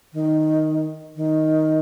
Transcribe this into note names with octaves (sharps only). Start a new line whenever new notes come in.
D#3
D#3